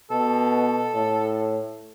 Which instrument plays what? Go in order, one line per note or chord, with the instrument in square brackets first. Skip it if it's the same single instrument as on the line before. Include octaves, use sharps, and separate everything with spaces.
[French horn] B2 [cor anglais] A4
[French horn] A2